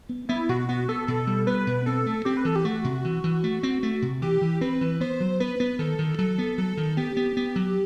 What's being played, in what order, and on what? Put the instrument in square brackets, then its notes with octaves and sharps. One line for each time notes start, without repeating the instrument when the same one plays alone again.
[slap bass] B3
[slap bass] B3 [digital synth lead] E4
[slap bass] B2 [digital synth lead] F#4
[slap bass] B3 [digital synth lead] F#4
[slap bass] B3 [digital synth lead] A4
[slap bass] B2 [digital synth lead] A4
[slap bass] G3
[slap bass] B3 [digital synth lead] B4
[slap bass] B2
[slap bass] C4 [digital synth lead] A4
[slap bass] A3
[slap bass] C4 [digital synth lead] G4
[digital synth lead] B4
[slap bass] E3 [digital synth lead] A4
[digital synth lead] G4
[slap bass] A3 [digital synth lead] F#4
[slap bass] C3
E3
E3
A3
C4
A3
C3
[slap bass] E3 [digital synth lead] G4
[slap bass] E3
[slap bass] C4 [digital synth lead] B4
[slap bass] E3
[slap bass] B3 [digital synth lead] C5
[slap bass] F#3
[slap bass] B3 [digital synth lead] B4
[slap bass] B3
[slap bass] D#3 [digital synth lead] A4
[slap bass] D#3
[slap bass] F#3 [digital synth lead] A4
[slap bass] B3
[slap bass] F#3 [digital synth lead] A4
[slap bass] D#3
[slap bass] B3 [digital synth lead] G4
[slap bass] B3
B3
F#3